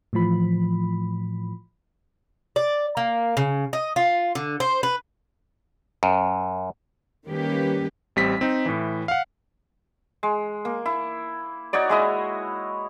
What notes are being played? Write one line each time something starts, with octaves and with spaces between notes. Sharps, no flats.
A2 E3 F3 B5
D5
A#3
C#3
D#5
F4
D3
C5
B4
F#2
D#3 G3 A#3 C#4 G4 B4
A1 G3 C4 B6
C4 D#4
A2 E3
F5 F#5
G#3
A#3
E4
D#4 F#4 C#5 D5
G#3 E4 D#5